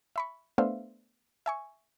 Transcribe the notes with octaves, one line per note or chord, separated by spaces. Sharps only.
E5 B5 C#6
A3 B3 D4 C5 E5 F5
E5 G#5 C#6